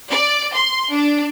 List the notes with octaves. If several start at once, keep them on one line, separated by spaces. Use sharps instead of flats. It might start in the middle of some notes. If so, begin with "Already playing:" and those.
D5
C6
D4